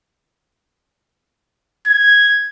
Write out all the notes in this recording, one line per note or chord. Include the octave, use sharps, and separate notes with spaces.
G#6